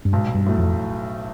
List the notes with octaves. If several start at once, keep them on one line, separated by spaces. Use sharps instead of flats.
G2
B1 G#2
G2
A2 F#3 A3
F2